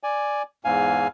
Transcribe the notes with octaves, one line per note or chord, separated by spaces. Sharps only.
D5 G#5
E2 G#2 F5 G#5